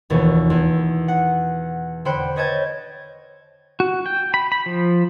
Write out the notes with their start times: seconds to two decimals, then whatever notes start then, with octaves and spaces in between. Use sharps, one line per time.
0.10 F1 D#2 B2 E3 C#6
0.50 E2
1.08 F#5
2.05 D3 C5 G5 B5 F#6 C#7
2.36 B4 C#5 D#5 A5 G6 G#6
3.80 F#4
4.06 G5
4.34 B5
4.52 B5
4.66 F3